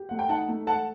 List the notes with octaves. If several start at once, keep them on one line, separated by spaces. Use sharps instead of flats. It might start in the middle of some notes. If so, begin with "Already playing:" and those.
Already playing: G4
A3 F#5
G5
D#4 F#5 A5
A3
A4 F#5 A5